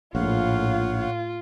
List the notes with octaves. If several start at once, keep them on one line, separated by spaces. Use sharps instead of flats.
A#1 A2 F4 C#5 F5 F#5
F4